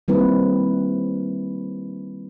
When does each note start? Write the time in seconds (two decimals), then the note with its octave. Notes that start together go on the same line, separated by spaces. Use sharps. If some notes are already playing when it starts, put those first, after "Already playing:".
0.08 D#3 G3 A#3 C4 E4 B4